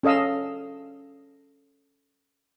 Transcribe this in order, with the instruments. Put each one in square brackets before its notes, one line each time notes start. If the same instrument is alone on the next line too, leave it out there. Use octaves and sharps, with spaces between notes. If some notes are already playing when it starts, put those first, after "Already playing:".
[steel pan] C#4 A4 D#5 F5 E6